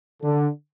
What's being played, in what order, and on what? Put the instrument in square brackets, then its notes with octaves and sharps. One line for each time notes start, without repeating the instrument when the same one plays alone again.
[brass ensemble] D3